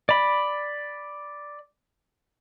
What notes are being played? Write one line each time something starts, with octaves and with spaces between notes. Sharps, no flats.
D5 B5